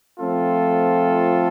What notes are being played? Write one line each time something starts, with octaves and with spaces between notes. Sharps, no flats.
F3 A3 C4 F4 A4